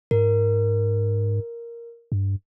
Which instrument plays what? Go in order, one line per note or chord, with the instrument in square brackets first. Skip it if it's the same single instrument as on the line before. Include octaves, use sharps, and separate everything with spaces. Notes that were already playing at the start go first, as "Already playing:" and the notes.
[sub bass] G#2 [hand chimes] A#4
[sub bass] G2